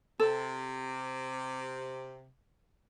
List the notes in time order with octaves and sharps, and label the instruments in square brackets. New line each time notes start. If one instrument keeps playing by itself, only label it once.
[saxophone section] C3 [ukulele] A4